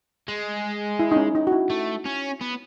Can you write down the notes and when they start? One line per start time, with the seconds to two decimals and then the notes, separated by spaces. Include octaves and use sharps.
0.28 G#3
0.99 E4
1.12 D#4
1.16 C#4
1.35 D#4
1.47 F#4
1.52 E4
1.70 A3
2.06 C#4
2.41 B3